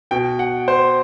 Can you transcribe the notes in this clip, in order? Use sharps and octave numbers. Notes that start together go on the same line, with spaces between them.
B2 G5
F#5
C5